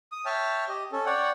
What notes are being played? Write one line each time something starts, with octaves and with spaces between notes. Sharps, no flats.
D#6
C#5 E5 G5 A5 F6
G4 D#5
C#4 A4
C#5 D5 F#5 G5